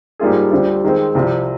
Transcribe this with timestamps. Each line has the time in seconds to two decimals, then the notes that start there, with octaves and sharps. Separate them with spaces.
0.19 G#2 G3 A#3 F4 G#4
0.51 D2 D3 G3 C4 F4
0.84 D#3 G#3 C4
1.15 C2 C3 F3 C4 F4